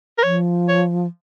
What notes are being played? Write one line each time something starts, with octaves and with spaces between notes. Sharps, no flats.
A#4
F3 C#5
C#5